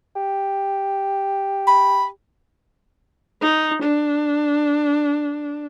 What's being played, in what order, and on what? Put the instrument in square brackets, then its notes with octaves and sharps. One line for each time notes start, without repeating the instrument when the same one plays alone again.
[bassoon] G4
[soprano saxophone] B5
[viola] D#4
D4